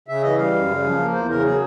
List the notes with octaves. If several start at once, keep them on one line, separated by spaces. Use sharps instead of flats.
C#3 E5
E3 D#5
G3 F5
F#2
C#3
F3
A#3
E2 C5
C#3 A#4
F#3 G#4